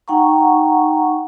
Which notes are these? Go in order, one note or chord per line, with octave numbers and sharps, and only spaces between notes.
D#4 F#5 G5 A#5 C#6